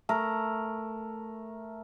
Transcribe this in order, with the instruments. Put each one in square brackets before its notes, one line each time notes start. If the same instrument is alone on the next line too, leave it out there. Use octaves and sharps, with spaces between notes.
[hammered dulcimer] A3 A#4